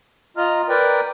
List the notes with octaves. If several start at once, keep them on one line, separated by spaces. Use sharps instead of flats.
F4 D#5 A#5 F6
A#4 B4 D5 G5